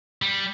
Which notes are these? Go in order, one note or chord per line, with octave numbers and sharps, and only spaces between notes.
G3